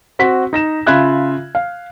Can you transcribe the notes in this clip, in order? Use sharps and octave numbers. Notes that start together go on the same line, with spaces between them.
C4 F#4 B6
D#4 A#6 E7
C#3 F4 E5 B5 F#6 G#6
F5